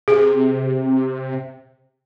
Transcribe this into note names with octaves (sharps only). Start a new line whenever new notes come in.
C3 G#4